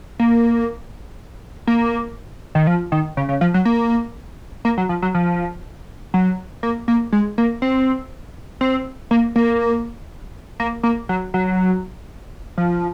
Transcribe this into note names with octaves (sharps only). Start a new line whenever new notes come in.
A#3
A#3
D#3
F3
D#3
C#3
C#3
F3
F#3
A#3
A#3
F#3
F3
F#3
F3
F#3
A#3
A#3
G#3
A#3
C4
C4
A#3
A#3
A#3
A#3
F#3
F#3
F3